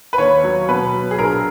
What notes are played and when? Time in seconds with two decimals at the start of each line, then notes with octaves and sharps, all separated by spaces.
0.13 B4
0.18 D#2 C#5
0.43 F#3
0.68 B2 B4
0.93 F#3
1.11 G#4
1.19 A#1 A#4